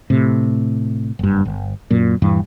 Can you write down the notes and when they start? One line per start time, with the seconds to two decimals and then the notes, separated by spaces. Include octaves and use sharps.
0.10 A2 C3
1.19 F#1 G2
1.45 G1
1.90 F#2 A#2
2.22 D#1 G2 E3